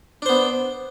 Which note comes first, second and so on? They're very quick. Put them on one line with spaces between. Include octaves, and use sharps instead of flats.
D4 C5 B3